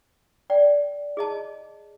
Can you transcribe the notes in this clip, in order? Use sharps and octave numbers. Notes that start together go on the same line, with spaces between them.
D5 G5
G#4 D#5 A5